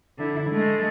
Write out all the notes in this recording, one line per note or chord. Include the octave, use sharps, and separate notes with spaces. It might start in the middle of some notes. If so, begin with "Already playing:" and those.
D3 E4
G#3 A3